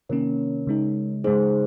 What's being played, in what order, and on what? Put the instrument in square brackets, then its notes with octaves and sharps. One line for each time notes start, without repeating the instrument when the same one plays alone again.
[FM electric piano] C3 D#3 A#3 C#4 [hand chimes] A#4 C#5
[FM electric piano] C#3 G#3 D#4
[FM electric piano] C#3 G#3 D#4 [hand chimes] G#4 C5